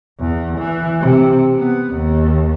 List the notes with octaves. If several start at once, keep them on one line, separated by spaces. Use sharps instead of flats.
E2
E3
C3
B3
D#2